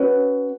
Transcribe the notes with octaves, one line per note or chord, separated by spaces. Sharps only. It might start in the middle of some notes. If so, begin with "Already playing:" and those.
Already playing: C#4 F#4 B4